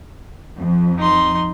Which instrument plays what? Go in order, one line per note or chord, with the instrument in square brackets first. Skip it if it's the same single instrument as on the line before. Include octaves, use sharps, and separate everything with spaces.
[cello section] F2
[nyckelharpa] D#4 C6